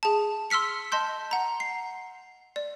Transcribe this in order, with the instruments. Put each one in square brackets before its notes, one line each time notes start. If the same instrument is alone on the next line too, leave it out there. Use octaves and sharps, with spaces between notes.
[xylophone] G#4 A5
C6 E6 F6 B6 C#7
D#5 A5 C6 G6
F#5 A#5
C7
D5